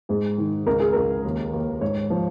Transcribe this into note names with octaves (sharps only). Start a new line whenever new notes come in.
G#2 G#4
D#3
C#2 A#4
G#4
C#2 A#4
D#2
D#2
G#2 C#5
F3